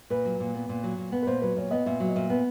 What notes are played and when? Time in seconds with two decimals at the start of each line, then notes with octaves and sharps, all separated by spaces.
0.10 A#2 B4
0.25 F#3
0.40 A#2
0.55 B3
0.69 A#2
0.83 F#3
0.98 A#2
1.12 B3
1.23 B4
1.27 A#2 C5
1.42 F#3 B4
1.56 A#2 C#5
1.71 B3 D#5
1.86 A#2 E5
2.00 F#3
2.08 D#5
2.15 A#2 E5
2.30 B3